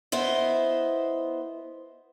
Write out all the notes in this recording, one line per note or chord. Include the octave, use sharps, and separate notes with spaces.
B3 E4 C5 D#5